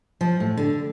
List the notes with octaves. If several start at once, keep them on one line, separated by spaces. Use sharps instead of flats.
F3
A2
D3